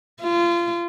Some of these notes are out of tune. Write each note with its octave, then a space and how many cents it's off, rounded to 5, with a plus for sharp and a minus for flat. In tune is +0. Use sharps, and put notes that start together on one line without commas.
F4 -25